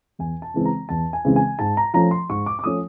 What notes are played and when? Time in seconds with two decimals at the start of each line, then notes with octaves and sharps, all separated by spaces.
0.19 E2 G#5
0.42 A5
0.54 C#3 E3 G#3 C4
0.65 A#5
0.89 E2 A5
1.13 G#5
1.25 C#3 E3 G#3 C4
1.36 G#5
1.59 G#2 A5
1.77 A#5
1.94 F3 A3 C#4 A#5
2.11 C6
2.29 G#2 C#6
2.46 D6
2.59 D6
2.64 F3 A3 C#4 D#6